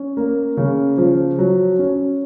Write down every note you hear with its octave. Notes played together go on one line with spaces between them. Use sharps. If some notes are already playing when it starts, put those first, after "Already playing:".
Already playing: C#4
A#3
C#3
F3
F#3
C#4